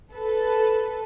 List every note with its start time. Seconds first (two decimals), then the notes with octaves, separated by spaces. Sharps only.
0.12 A4 B4